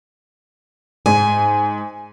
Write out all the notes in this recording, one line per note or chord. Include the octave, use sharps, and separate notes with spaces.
G#2 G#5